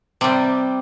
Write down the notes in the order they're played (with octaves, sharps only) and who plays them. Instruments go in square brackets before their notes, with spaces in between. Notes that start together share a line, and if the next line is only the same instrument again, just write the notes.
[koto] C3 G3